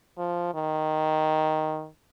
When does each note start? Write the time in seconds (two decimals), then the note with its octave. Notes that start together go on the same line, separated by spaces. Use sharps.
0.18 F3
0.54 D#3